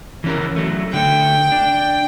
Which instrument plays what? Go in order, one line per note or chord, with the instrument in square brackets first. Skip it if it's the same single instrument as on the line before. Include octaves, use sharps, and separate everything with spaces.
[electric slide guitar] E3 C#4 A#4
F#3 A3
[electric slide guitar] D3 A3 [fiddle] G5
[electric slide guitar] D4